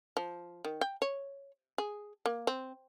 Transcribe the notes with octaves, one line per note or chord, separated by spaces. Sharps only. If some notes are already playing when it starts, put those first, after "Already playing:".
F3
D#3
G5
C#5
G#4
A#3
C4